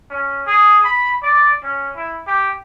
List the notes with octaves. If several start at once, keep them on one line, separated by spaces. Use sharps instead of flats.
C#4
G#4
B5
D5
C#4
E4
G4